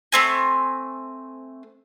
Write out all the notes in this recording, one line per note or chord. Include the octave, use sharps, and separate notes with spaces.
A3 C4 G#5